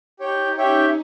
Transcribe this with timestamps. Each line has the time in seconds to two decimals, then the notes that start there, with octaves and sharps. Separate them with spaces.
0.19 D#4 G4 C#5 G5
0.56 C#4 G4 C#5 E5 G5